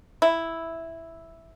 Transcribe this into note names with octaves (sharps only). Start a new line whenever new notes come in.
E4